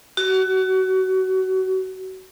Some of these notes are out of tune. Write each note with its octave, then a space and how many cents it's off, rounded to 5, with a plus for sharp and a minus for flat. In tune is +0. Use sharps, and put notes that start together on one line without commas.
F#4 +25